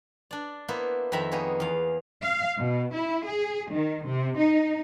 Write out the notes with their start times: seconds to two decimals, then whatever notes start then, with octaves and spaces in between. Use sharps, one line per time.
0.31 D4 D5
0.68 A#3 B3 E4 C5 F#5
1.12 F2 D#3 C4 E5 A#5 B5
1.32 A#3 B3 D#4 G#4 C#5
1.60 E2 F5
2.22 F5
2.58 B2
2.94 E4
3.26 G#4
3.72 D#3
4.05 C3
4.37 D#4